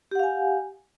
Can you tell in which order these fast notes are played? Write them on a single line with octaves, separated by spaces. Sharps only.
G4 F#5 F5 G#5